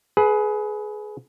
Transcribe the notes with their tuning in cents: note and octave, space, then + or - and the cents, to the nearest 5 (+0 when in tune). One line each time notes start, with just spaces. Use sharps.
G#4 +25 B4 +0